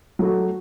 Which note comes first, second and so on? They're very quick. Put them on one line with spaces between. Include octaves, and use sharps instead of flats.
F#3 A3 F#4